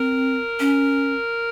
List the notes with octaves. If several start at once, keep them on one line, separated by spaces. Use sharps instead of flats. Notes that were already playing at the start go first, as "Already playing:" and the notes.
Already playing: C4 A#4
C#4